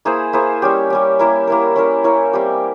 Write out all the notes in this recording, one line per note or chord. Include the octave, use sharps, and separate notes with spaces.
A#3 E4 G#4 C5
A#3 E4 G#4 C5
G3 C#4 G4
G3 C#4 G4
A#3 E4 A#4
A#3 E4 A#4
C#4 E4 A#4
C#4 E4 A#4
G3 C4 G4